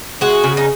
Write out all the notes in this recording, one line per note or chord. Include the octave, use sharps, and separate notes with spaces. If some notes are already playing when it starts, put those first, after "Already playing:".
G#3 F#4
C#3
D#4